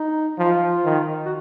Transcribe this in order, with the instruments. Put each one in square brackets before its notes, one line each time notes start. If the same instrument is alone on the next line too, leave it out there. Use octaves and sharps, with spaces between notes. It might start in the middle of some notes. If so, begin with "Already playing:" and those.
Already playing: [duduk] D#4
[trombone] F3 [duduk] F4
[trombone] D#3
[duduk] F#4